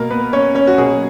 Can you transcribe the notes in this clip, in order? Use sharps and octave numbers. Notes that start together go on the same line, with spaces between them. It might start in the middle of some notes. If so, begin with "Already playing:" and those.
Already playing: B2 A#3 A#4
B3 B4
C#4 C#5
C#4 C#5
F#4
B2 F#3 A#3 G#4